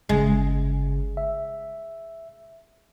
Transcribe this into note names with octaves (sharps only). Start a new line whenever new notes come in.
G1 C#3 G#3
E5